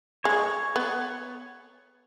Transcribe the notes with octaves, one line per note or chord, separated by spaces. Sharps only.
G#3 C#5
B3